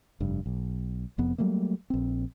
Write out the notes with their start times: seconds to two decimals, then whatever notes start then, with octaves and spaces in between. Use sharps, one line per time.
0.20 F1 G2
0.46 B1
1.18 F1 F2 B3
1.38 F#3 G3 A3 A#3
1.90 A#1 C4